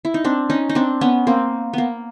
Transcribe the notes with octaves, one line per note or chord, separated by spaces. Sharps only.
E4
D#4
C4 D4
C#4 D#4
D#4
C4 D4
B3 C#4
A#3 C4
A#3 B3